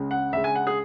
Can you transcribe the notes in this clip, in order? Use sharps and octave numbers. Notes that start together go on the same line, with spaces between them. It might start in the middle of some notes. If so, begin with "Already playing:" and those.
Already playing: C#2 C#3 G#3
F#5
C#2 C#3 G#3 E5
G#5
F#5
G#4